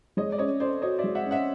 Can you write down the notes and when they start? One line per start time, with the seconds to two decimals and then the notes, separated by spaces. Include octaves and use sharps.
0.17 G#3 C#5 D#5
0.32 D5
0.38 C#4 C#5 D#5
0.60 A4 C5 D5
0.82 F#4 C#5 D#5
0.98 D5 E5
1.04 G#3
1.15 E5 F#5
1.26 C#4
1.31 E5 F#5